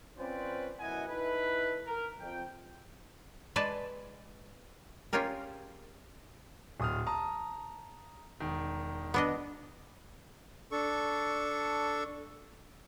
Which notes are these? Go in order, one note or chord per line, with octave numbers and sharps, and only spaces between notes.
C4 C#4 F4 B4 C5 D5
F#2 B2 E4 D#5 F#5 G#5
D#4 E4 A4 B4
A#4
F2 G5
G#3 B4 D5 G#5 A5
C#4 F4 G4 G#4 A#4
D1 D#6 F6
A5 A#5 D#6
E1 D#3
B3 D4 D#5
D4 A4 C#6